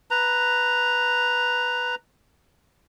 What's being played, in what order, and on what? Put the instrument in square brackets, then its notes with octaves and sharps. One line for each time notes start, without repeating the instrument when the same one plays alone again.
[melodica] B4 A#5